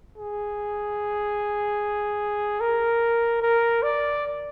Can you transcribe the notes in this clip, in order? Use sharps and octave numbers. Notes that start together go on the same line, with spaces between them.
G#4
A#4
A#4
D5